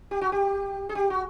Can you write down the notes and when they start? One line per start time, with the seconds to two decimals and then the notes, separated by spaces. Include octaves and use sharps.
0.11 G4
0.21 F#4
0.32 G4
0.89 G#4
0.95 G4
1.10 F#4